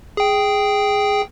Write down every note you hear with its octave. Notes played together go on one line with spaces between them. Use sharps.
G#4 G5